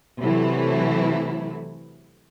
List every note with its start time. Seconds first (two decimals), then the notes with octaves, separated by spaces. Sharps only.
0.20 C3 E3 F#3 A3 E4